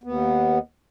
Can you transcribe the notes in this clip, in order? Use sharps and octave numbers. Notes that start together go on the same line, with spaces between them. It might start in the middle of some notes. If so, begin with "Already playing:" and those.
D#2 B3